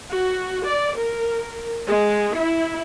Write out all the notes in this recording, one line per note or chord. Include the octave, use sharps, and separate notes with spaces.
F#4
D5
A#4
G#3
E4